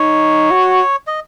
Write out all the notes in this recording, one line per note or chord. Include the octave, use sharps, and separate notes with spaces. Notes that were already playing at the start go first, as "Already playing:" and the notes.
Already playing: D#4 C#5
F#4
D#5